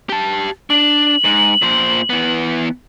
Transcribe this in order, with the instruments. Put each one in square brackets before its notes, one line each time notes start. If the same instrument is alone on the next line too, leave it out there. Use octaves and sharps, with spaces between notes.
[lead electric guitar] G4 A5
[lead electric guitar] D4 [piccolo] F#7
[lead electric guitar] G#2
A#2 C5
E3 B3